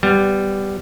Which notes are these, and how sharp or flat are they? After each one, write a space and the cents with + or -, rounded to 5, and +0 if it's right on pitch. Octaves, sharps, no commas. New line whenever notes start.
G3 +0 B3 +15